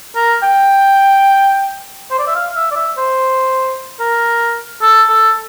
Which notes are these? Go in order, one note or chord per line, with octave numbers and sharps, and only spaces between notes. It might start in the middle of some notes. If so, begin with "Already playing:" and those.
A#4
G5
C5
D5
E5
F5
E5
D5
E5
C5
A#4
A4
A4